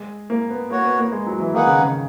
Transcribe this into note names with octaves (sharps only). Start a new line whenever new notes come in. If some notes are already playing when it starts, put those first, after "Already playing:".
Already playing: G#3
A#3
B3
A#3 F#4 C#5 F#5
B3
A#3
G#3
F#3
E3
D#3 A#3 D#4 G#4 B4 F#5
C#3
C#3